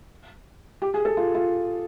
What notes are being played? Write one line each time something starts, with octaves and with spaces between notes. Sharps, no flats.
G4
G#4
A4
F4
F4